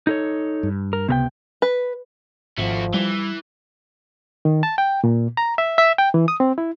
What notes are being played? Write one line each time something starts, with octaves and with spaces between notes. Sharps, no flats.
D#4 A4 C#5
G2
A#4
C#2 C3 B3 A#4 G5
B4
G#1 F3 A3 F#4
E3 G3
D#3
A5
G5
A#2
A#5
E5
E5
G5
E3
D#6
C4
E4